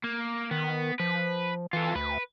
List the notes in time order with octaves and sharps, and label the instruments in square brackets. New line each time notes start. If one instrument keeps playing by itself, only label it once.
[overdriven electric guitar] A#3
[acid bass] D#3 [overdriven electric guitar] B3
[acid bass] F3 [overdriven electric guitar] B4
[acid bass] E3 [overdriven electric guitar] F4 A4
[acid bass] D2 [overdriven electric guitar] B4